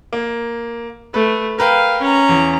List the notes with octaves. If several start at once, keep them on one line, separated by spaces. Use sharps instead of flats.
A#3
A3 B4
A#4 B4 F5 G5
C#4 A#5
E2